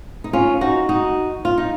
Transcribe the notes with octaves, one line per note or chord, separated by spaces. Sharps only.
D#4
C#4 F4
D#4 F#4
D#4 F#4
F4
D#4